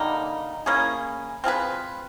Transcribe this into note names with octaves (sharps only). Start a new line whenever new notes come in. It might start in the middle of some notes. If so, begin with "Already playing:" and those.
Already playing: D3 G3 A#3 D#4
A#3 C#4 E4 G#4
C4 F4 G#4 B4